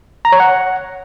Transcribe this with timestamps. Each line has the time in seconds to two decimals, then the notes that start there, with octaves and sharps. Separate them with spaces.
0.25 A#5
0.32 C#5
0.40 F#5